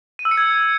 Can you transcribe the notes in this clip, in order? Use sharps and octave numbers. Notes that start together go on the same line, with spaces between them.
D#7
E6
C#7
G#6